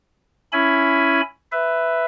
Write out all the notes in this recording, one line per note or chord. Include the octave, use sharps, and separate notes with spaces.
C#4 E4 G#5 B5
B4 E5